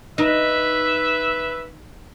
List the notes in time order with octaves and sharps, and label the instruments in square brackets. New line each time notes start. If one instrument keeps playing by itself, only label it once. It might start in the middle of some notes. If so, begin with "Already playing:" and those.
[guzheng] D#4 [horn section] B4 E5